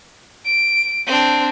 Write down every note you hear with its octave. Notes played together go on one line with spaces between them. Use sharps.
D7
C4 D4